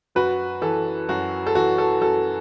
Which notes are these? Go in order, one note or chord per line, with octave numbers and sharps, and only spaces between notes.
F#2 F#4 B4
E3 A4
F#2 F#4
A4
E3 F#4
A4
F#2 A4